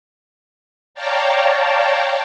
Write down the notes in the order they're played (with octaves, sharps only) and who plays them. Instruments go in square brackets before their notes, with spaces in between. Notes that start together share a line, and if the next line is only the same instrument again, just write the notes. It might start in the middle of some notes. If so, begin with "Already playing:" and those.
[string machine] C#5 D5 F5 G5 A5 A#5